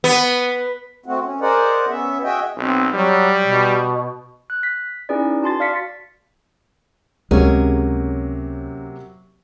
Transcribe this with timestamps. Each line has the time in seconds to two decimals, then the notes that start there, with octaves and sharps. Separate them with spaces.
0.04 B3
1.06 A3 C4 F#4
1.23 C#4
1.41 G#4 A#4 C5 D5 D#5 F#5
1.89 B3 C#4 E5
2.23 F#4 G#4 D#5 E5 G5
2.57 B1 C4
2.93 F#3 G3
3.44 B2
4.50 F#6
4.63 B6
5.09 C#4 D#4 E4 G#4 B4 D5
5.42 F#4 A5 C6 A6
5.60 D5 F5 F6 A6 B6 C#7
7.31 C#2 C3 F#3 G#3 A#3 C#4 G#4